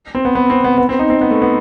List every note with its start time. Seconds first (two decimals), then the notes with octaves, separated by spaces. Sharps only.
0.15 C4
0.25 B3
0.35 B3
0.50 C4
0.64 B3
0.78 B3
0.89 C4
0.99 D#4
1.10 C4
1.21 B3
1.31 A3
1.42 B3